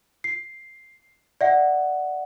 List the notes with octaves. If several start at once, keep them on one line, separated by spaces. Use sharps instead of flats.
C7
D5 E5 F#5